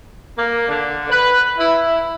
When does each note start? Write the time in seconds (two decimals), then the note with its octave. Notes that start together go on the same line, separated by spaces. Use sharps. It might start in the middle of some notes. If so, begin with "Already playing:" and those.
0.37 A#3
0.68 D3
1.10 B4
1.58 E4